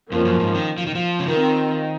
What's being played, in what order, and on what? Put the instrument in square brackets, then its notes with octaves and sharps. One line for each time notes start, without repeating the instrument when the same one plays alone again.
[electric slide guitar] F2 [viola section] F3 A#3 C#4
[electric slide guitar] F#2
G#2
D#3
F3
D#3
F3
C#3
[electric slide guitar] D#3 [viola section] C4 F4 A#4